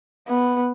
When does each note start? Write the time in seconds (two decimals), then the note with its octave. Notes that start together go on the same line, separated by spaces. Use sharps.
0.28 B3